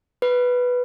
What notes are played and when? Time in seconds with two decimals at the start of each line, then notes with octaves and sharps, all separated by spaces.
0.22 B4